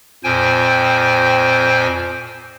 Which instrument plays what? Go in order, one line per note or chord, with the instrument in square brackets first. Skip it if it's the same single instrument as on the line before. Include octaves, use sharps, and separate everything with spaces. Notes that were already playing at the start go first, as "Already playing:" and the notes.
[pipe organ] F2 A#2 C5 G5 G#5